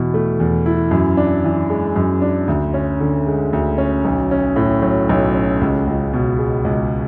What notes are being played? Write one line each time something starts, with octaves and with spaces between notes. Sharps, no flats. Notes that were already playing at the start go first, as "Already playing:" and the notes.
Already playing: E2 B2 E4
A3
E2
E4
F#2
D4
E3
G#3
F#2
D4
D2
C#4
D3
G#3
D2
C#4
B1
C#4
A2
F#3
B1
C#4
C#2
C#2
B2
G#3
C#2